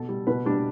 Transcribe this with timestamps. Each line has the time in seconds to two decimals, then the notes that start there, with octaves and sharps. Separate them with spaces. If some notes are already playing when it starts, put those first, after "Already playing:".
Already playing: B2 A4
0.09 G3
0.27 B2 B4
0.45 G3 D4